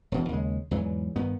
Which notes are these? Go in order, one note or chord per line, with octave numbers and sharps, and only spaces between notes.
E1 B2 E3
D#2 C#3 G#3
E2 G#2 E3 F#3
G2 D#3 B3